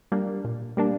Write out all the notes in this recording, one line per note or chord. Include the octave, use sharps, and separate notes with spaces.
G3 A#3 D4
A#2
G3 A#3 D4